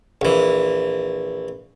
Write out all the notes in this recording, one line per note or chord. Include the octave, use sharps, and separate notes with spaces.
A#1 E3